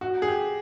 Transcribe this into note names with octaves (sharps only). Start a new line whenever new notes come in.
F#4
G#4
G4